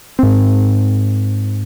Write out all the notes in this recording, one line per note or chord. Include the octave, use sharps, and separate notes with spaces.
G#2 C4